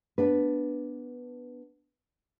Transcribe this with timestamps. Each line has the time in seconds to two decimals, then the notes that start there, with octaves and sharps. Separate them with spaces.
0.18 B3 D4 B4